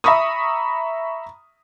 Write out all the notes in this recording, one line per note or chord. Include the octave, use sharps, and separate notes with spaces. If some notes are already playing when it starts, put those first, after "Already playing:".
E5 A#5 B5 C#6 D#6